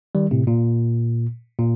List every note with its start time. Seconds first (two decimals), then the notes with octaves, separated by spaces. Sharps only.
0.15 D#3 G3
0.31 A2 C3
0.47 A#2
1.59 A#2